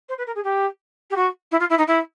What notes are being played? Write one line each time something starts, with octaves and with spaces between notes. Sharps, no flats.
C5
B4
A#4
G#4
G4
G4
F#4
E4
F4
E4
D#4
E4